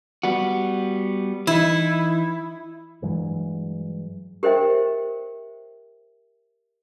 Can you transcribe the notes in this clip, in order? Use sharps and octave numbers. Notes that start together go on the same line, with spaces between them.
G3 B3 F#4
E3 D#4 E4
G2 E3 F#3 G#3
G4 A#4 C5 D#5 E5 G5